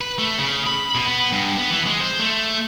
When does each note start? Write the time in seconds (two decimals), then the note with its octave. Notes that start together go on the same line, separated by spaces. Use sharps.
0.01 B4
0.18 A3
0.38 C#3
0.67 B5
0.95 B2
1.07 B3
1.32 G2
1.57 B3
1.71 E3
1.86 G#3
2.00 C5
2.19 A3